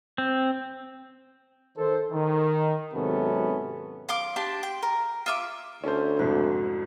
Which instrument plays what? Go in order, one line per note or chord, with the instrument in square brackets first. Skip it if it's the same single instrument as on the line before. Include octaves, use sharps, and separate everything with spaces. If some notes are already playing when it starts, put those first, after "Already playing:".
[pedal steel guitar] C4
[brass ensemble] D#3 A4 C5
D#3
G#1 C3 F#3 B3 C#4 A4
[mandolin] F5 C6 D6
D4 G4 A5 C6
G5
A#4
F4 E5 D6
[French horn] D2 [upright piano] C#4 A4 C5
[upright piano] C2 F2 G#2 [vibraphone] F#4